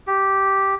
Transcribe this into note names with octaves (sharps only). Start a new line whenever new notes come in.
G4